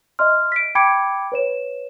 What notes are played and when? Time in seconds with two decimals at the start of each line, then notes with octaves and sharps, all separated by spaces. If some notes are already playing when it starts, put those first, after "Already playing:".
0.19 D#5 E5 C6 F6
0.52 B6 D7
0.75 G5 B5 D6 G#6 C#7 D7
1.32 B4 C#5 E7